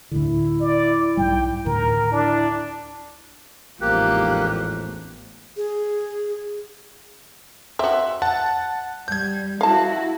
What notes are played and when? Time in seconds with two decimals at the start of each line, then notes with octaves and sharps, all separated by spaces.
0.11 D2 A2 D3 E4
0.60 D5
1.17 B1 G#2 G3 G5
1.66 D2 A2 D#3 A#4
2.12 D4 E4
3.81 A1 E2 G#2 F3 A#3 G4 F#6
5.57 G#4
7.79 C4 F#4 E5
8.22 F#5 A5
9.08 G3 G6 G#6
9.61 E4 F#4 F5 A5